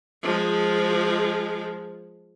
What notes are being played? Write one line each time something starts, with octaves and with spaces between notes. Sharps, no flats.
F3 G#3